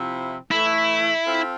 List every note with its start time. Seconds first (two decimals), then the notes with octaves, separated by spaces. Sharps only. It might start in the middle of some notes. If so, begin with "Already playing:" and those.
Already playing: C3 F3 C4 E4
0.51 A2 E3 A3 E4
1.25 C4 F4 A4